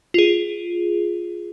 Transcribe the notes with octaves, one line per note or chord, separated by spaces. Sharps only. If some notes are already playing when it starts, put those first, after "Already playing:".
F4 G#4